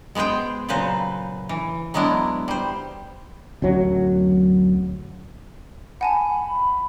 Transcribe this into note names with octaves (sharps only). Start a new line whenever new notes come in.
G#3 B3 G#4 C5 G5
A#2 C#3 F#3 B4 C5
E3
F#3 G#3 B3 D4 E4
G3 C5
D1 F#2 F#3
F#5 G#5 A5 B5